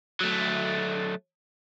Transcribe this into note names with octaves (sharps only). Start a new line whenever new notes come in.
F#3 A3